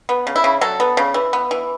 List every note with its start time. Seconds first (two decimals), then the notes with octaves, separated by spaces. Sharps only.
0.09 B3
0.27 C#3
0.36 E4
0.44 C#3
0.61 F#3 A4
0.80 B3
0.97 C#3
1.14 E3
1.33 B3
1.51 E3